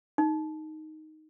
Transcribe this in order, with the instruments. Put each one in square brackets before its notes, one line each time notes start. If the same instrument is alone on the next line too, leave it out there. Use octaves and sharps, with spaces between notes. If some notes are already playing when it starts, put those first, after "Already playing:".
[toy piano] D#4